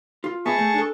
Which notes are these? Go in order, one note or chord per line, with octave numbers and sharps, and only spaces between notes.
F4
B3 G#4 D#5 E5 A5 C#6
A3
D4 A4